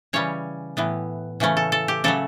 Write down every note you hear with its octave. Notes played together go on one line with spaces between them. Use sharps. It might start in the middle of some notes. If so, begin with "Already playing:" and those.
C#3 E3 G3 C#4 C#5
A2 E3 B3
C#3 E3 A3 C#4
A4
A4
G4
C#3 F#3 A3 A4